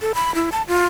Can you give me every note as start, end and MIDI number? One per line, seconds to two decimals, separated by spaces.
0.01 0.12 69
0.15 0.34 83
0.35 0.50 64
0.52 0.62 81
0.68 0.86 65